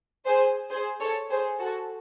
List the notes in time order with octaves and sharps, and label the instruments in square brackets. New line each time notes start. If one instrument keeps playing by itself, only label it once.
[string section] G#4 C5
G#4 C5
A4 C#5
G#4 C5
F#4 A4